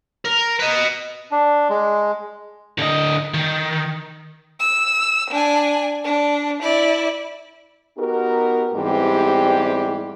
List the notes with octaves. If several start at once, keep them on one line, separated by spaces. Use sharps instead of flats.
A#4
B4 D#5
D4
G#3
D3 D#5
D#3
E6
D4 G#5
D4
E4 D5
B3 D#4 F#4 G4 A#4
E2 G#2 E3 G3 C4 G4